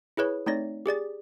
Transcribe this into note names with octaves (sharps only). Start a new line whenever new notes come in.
E4 G#4 B4 C#5
A3 C4 D#4 C#5 D5 A#6
G4 G#4 D5 A6